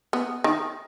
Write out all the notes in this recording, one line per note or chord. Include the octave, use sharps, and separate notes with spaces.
B3
D#3